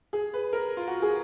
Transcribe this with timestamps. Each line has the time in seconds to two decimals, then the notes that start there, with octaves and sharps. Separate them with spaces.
0.13 G#4
0.34 B4
0.53 A#4
0.77 F4
0.87 F#4
1.02 G#4